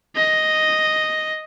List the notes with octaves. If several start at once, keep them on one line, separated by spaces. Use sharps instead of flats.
D#5